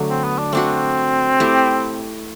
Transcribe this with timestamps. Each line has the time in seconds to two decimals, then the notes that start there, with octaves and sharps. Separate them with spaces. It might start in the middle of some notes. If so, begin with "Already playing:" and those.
Already playing: D3 F#3 A3
0.09 C4
0.24 B3
0.39 D4
0.53 A3 C4 D4 F#4
1.40 A3 E4 G4